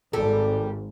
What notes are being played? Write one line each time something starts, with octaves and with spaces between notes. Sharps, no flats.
G#1 G3 A4